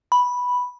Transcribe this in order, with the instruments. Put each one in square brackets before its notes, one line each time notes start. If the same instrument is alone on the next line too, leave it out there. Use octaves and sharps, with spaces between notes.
[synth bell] B5